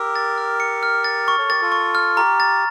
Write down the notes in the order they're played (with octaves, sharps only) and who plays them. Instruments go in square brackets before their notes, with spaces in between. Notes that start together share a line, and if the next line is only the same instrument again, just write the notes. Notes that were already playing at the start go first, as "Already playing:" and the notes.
Already playing: [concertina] G4 A#4 [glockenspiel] E6
[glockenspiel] A6
F6
C#7
F6
A6
C#6
[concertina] A4 C#5
[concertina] G4 A#4 [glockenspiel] A6
[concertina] F4 A4
[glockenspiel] C#6
F6
[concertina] G4 [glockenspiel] A#5
[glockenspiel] A6